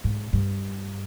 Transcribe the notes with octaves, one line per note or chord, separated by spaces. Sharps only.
G#2
G2